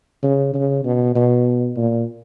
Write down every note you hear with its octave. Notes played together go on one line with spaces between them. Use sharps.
C#3
C#3
B2
B2
A#2